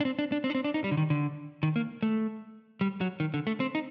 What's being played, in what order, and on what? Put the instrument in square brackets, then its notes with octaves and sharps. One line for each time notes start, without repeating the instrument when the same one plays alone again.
[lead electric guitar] D4
C4
D4
D4
C4
D4
C4
D4
D#4
G3
D3
D#3
D3
D#3
A#3
A3
G3
F#3
D#3
D3
A3
C4
D#4